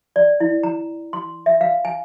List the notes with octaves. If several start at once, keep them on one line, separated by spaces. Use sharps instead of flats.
D5
E4
A#5
C6
E5
F5
G#5